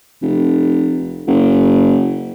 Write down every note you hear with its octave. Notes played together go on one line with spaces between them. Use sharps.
F1
F#1